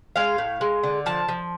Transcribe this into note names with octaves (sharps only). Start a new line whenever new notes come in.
G#3 F5
A2
G#3
D3
F3 A5
F3